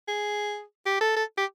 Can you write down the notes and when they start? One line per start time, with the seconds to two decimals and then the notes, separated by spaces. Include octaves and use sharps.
0.08 G#4
0.86 G4
1.01 A4
1.17 A4
1.38 G4